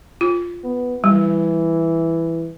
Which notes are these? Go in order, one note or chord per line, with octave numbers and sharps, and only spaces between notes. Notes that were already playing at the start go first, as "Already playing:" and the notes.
F4
B3
E3 G3